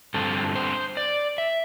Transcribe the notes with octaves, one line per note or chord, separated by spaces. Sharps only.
G2 D3 C4 A4
C5
D5
E5